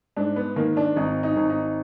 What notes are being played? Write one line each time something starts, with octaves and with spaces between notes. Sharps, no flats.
G#2 D4
B3
D#3 A#3
D4
G#1 D#4
D#4
G#1
D#4